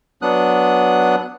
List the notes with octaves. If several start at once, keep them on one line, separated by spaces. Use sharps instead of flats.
F#3 B3 D4 D#6 F#6